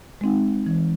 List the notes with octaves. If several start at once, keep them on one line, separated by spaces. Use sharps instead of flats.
G#3 C4 D#4
E3